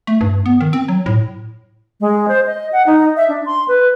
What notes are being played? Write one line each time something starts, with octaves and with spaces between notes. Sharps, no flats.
A3
G2
B3
D#3
C4
F#3
A2
G#3
C5
D#5
F#5
D#4
E5
D4
C6
B4